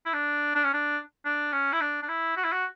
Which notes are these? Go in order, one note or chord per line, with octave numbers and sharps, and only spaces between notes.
E4
D4
D4
C#4
D4
D4
C#4
E4
D4
D4
E4
F#4
E4
F#4